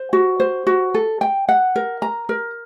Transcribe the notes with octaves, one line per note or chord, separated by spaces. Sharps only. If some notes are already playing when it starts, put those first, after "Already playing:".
Already playing: C5
F#4
C5
F#4
A4
G5
F#5
A#4
A#5
A#4